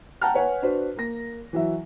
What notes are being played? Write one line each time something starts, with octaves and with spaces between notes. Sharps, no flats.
F#5 G5 A5 A#5 F6
B4 C#5 F#5 G#5
D4 F#4 B4 C5
A#3 A#6
E3 F#3 E5